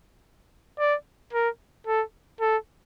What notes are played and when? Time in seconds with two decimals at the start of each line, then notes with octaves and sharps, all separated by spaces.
0.79 D5
1.33 A#4
1.87 A4
2.41 A4